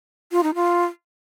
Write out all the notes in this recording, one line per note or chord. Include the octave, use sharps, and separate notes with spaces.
F4
D#4
F4